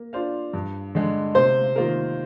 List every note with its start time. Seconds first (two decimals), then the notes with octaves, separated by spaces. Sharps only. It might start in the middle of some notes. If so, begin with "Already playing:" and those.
Already playing: A#3
0.13 D4 F4 C5 F5
0.53 G2
0.95 D3 G#3
1.35 C3 C5
1.76 D#3 A#3 F4 A#4